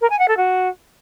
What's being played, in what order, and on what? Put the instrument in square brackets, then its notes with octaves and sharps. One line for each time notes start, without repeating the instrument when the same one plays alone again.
[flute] A#4
G#5
F#5
A4
F#4